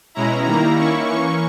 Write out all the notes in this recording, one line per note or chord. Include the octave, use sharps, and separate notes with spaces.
B2 G#3 C#4 E4 A#5
D#3 G3 A#3 E4 A#5
D#3 A#3 C#4 E4 C#6
E3 A#3 C#4 C#6